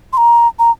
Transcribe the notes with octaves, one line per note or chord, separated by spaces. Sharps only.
C6
A#5
A#5